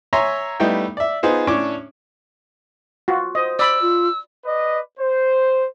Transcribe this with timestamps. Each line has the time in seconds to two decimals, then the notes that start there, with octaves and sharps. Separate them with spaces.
0.13 C#5 E5 G#5 A#5 C6
0.60 G3 A3 B3 D#4 E4 G5
0.97 D5 E5
1.23 B3 D#4 F4 G#4 C5
1.47 A2 C#4 D4 C#5 D6
3.08 F4 F#4
3.35 C5 D#5
3.59 D5 B5 E6
3.81 F4
4.45 B4 D5 D#5
4.99 C5